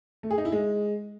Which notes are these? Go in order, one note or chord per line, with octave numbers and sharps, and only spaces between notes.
A3
G#4
D#4
E4
G#3